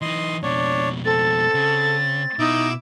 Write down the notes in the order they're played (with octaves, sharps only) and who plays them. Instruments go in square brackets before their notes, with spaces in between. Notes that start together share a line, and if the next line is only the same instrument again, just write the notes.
[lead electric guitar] E3 D#4 [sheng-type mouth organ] D#5 C6
[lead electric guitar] F2 B2 [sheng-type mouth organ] D4 C#5
[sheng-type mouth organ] C4 [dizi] A4 [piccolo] A6
[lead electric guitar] C#3
[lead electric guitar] B2 [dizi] D#4 [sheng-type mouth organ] E4 D6 E6